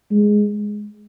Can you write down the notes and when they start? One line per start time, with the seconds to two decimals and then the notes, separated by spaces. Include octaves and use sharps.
0.11 G#3